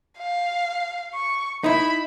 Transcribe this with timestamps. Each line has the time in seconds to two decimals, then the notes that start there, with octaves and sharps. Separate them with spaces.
0.18 F5
1.14 C#6
1.64 D#4 E4 B5